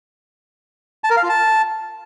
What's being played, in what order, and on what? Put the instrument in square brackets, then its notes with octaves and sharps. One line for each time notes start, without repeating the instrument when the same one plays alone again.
[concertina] A5
A#4
F5
F4
A5